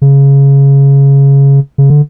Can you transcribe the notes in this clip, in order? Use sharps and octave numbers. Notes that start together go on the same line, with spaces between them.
C#3
C#3
D3